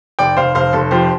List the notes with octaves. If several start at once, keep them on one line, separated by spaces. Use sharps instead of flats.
F1 D5 G5
F1 C5 F5
F1 C5 F5
F1 A4
F3 G4 C5